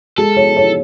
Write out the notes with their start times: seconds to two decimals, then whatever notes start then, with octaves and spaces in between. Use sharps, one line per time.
0.18 G#3 A4
0.36 C#5
0.57 C#5